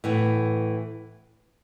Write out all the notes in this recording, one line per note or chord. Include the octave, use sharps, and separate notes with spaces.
A2 E3 B3